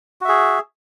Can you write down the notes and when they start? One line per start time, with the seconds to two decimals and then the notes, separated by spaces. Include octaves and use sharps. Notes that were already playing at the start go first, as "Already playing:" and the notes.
0.21 F#4
0.25 E5
0.29 G#4